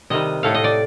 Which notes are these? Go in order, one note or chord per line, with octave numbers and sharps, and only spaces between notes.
C3 D#3 G3 D#5
A2 A3 F5
D#5
D5